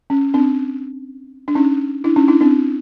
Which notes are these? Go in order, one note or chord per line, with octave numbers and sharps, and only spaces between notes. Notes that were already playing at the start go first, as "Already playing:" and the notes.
C#4
C4 D4
D4
C#4 D#4
D4 E4
C#4 D#4
D4 E4
C4 D4